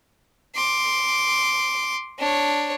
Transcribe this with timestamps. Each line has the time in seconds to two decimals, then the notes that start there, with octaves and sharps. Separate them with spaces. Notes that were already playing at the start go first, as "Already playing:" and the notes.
0.55 C6 D6
2.18 D4 C#5